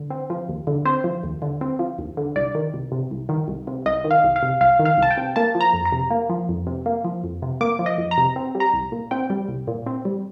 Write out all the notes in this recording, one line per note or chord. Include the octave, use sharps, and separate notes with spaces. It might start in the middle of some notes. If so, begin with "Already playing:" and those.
Already playing: D3
C4
F3
D#2
D3
C4 C5
F3
D#2
D3
C4
F3
D#2
D3
C2 D5
D#3
C2
C3
C2
D#3
C2
C3
C2 D#5
D#3
F5
C2
F5
C3
C2 F5
D#3
F5
C2 A5
G5
C3
A#3 A5
F3
A#5
F2
A#5
C3
A#3
F3
F2
C3
A#3
F3
F2
C3
A#3 D6
F3
D#5
F2
A#5
C3
C4
G3
A#5
C2
A#2
C4 G5
G3
C2
A#2
C4
G3